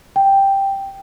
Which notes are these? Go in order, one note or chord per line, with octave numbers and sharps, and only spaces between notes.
G5